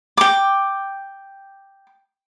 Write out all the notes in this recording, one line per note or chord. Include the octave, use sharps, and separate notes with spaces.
G5 D6